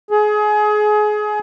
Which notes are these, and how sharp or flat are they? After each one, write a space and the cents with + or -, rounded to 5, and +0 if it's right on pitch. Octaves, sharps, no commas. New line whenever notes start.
G#4 +25